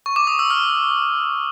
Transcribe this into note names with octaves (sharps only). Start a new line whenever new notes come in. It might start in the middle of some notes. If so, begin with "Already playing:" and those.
C#6
D6
D#6
E6
F6